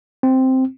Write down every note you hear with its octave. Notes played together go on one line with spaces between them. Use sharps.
C4